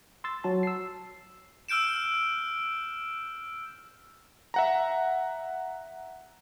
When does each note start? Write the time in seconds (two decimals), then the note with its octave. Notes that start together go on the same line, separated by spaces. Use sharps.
0.24 C6 E6 A6
0.44 F#3 F#4 A5
0.63 E6 C7
1.69 E6 F6 G6 D7 E7
4.54 E5 F#5 A#5